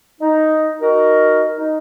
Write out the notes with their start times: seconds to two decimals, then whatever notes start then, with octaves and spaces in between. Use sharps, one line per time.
0.21 D#4
0.82 D#4 F#4 A#4
1.58 D#4